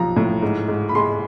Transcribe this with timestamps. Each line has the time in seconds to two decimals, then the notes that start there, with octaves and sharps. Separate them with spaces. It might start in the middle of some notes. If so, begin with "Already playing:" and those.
Already playing: B1 F3 A#5
0.16 A2
0.42 G#2
0.68 G#2
0.89 B5
0.95 G#3 C6